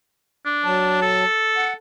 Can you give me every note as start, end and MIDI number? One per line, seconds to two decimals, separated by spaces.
0.46 0.98 62
0.65 1.25 54
0.65 1.25 81
1.02 1.73 69
1.56 1.73 78